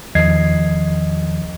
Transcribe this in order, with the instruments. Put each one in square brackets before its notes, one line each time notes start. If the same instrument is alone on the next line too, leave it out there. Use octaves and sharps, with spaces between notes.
[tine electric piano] E2 D#3 F3 D#5 G#6 C7